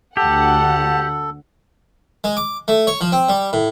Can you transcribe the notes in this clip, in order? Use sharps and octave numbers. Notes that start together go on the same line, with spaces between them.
D2 G4 A4 F#5 A5
G#3
D6
A3
C#5
F3
C4
G3
A2